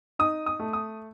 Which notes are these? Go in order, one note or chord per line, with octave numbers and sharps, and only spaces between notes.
D#4 D#6
D#6
A3
D#6